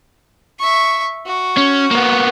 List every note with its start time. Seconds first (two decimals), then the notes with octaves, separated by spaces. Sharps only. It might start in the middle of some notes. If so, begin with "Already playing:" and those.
0.59 E5 C#6
1.26 F#4
1.58 C#4
1.91 A#3 B3